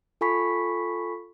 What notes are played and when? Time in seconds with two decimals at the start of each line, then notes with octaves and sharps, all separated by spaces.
0.21 F4 A4 G#5 B5 C#6 B6